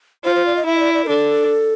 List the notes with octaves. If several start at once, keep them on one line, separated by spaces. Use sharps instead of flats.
F4 C5
C5
D5
D#5
E4 E5
D#5
D5
D5
A#4
D4 A4